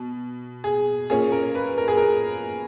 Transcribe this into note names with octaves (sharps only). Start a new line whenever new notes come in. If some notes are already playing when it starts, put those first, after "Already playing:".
Already playing: B2
G#4
A#2 A#3 C#4 G#4
A#4
B4
A#4
G#4
A#4